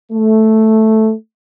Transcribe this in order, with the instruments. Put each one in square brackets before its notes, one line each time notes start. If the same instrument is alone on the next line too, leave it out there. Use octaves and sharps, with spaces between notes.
[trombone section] A3